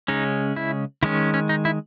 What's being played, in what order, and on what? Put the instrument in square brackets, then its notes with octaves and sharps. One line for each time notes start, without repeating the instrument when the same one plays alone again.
[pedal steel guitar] C#3 G#3 C#4 D#4
E4
D#3 G#3 C#4 E4
C#4
D#4
E4